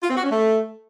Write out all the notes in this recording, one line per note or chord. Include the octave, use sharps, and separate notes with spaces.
F4
C4
F#4
C#4
A3